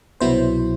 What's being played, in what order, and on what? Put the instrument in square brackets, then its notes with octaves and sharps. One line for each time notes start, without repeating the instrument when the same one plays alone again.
[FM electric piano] C2 B2 F#3 B3 E4 C5